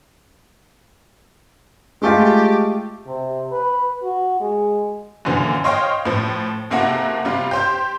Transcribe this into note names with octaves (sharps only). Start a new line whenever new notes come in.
G#3 A3 F4 G4
C3
B4
F#4
G#3
F#2 A#2 D3 E3 F3
C5 C#5 D#5 F5 G5
A2 F3
F#1 C3 A#3 E4 F#4 A4
C3 G3 F4
G4 C5 G6